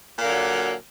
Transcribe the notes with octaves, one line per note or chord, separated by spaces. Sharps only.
A#2 D3 F#3 A#3